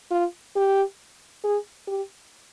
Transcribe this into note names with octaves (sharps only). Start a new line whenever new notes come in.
F4
G4
G#4
G4